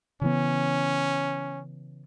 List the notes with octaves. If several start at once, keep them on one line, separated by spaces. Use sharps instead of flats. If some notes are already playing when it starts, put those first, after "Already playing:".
C#3 E3 B3 C#4